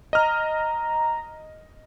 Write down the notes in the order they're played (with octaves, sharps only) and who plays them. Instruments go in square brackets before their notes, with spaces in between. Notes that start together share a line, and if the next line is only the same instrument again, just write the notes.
[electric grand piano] D#5 F6 [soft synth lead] A#5